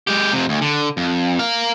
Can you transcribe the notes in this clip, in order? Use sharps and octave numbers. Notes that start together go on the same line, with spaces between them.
G#3 G4
F2 C3
D2
D3
F2
A#4 F5